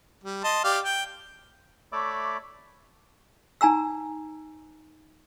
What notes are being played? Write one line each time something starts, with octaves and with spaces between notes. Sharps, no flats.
G3
D#5 A5 C6
G4 D5 F5
G5
A3 C#5 D5 E5 B5 D6
D#4 G#5 A#5 E6